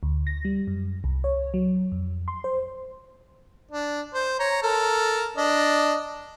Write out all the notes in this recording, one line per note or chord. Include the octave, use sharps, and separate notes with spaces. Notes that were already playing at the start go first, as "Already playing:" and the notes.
D2
A#6
G3
F#2
C2
C#5
F#3
F2
C6
C5
D4
C5
C#5 A#5
A4 A#4
D4 D#5